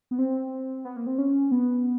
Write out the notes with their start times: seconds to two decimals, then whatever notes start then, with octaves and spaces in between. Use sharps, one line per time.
0.11 B3
0.19 C4
0.85 B3
0.96 A#3
1.07 C4
1.18 C#4
1.51 B3